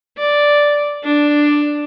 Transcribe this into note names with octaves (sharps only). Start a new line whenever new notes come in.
D5
D4